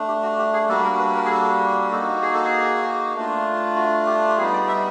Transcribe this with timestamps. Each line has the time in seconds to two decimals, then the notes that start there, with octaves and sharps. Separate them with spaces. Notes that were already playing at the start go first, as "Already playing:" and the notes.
Already playing: A3 D4
0.08 G4
0.23 F#4
0.39 G4
0.53 G#4
0.69 G3 A#3 D4 F#4 A4
0.84 A#4
0.99 B4
1.15 A#4
1.25 G#4
1.31 A4
1.92 A#3 D#4 F#4 A4
2.22 G#4
2.33 A4
2.44 G#4
3.15 A3 D4 F4
3.76 F#4
4.07 G4
4.28 G4
4.37 G3 B3 D#4 G#4
4.54 D5
4.68 E5